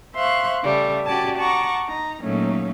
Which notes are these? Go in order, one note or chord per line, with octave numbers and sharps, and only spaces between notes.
C5 E5 F5 C6 C#6 F#6
C#3 G3 A3
C#4 F#4 G4 D5 G#5 A5
F#5 A5 A#5 C#6 D6
D#4 A#5
A#2 F#3 A3 A#3 C#4 D#4